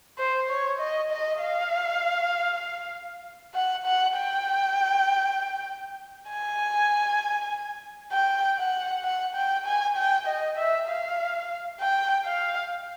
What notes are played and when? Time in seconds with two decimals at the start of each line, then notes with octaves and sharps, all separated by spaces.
0.18 C5
0.50 C#5
0.79 D#5
1.10 D#5
1.41 F5
3.54 F#5
3.85 F#5
4.16 G5
6.30 G#5
8.13 G5
8.58 F#5
9.04 F#5
9.35 G5
9.66 G#5
9.97 G5
10.27 D#5
10.57 E5
10.87 F5
11.80 G5
12.25 F5